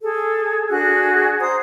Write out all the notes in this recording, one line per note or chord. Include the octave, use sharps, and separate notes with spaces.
G#4 A4
D4 F#4 G#4 F#6
C5 A#5 D#6